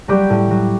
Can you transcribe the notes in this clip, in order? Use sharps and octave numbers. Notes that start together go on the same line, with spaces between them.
F#3 G3 G4
A2
F#3